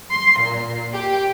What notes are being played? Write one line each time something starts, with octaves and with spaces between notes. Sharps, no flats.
C6
A#2
G4